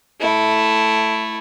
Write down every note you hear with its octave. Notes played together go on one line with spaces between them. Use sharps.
A3 E4